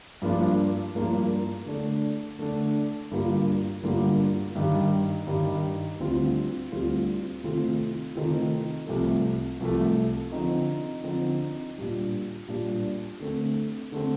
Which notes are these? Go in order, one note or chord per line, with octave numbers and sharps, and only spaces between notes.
G2 F3 A#3 D4 F4
G2 F3 A#3 D4 F4
D3 A3 D4
D3 A3 D4
G2 D3 G3 A#3 F4
G2 D3 G3 A#3 F4
G2 D#3 G3
G2 D#3 G3
D2 D3 G3 C4 F4
D2 D3 G3 C4 F4
C3 D#3 A3 C4 F4
C3 D#3 A3 C4 F4
C2 C3 F3 A3
C2 C3 F3 A3
D3 F3 C4 D#4
D3 F3 C4 D#4
A#2 G3 D4
A#2 G3 D4
D3 A3 C4
D3 A3 C4